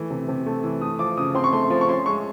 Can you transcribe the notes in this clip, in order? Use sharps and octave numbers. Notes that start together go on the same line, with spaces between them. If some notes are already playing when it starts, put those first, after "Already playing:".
Already playing: E3 A3
C3
C3
A3
E3
A3 D#6
F3 D6
C#3 D#6
C4 C6
C#6
A3 C6
F3
C#6
C#4 C6
G#3 C#6